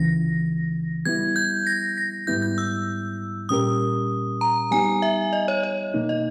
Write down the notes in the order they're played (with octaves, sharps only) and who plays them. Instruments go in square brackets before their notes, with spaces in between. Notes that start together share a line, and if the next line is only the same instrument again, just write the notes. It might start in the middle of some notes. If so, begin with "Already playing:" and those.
Already playing: [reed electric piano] C#2 C#3 E3 [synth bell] A#6
[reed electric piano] G3 B3 E4 [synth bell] G#6
[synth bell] G6
A#6
A#6
[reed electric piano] G#2 G3 B3 E4 [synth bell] G6
[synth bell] G6
E6
[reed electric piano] A#2 G3 C#4 G4 A#4 [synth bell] D#6
[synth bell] A#5
[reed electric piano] G3 B3 D#4 G4 [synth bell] G#5
[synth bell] E5
D#5
C#5
C#5
[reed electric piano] B2 A#3 D#4
[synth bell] D#5